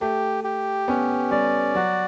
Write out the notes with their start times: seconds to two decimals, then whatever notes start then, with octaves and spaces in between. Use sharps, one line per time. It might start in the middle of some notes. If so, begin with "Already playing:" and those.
0.01 A3 G4
0.44 G4
0.88 B3 C#4
1.31 G3 D5
1.75 F#3 F#4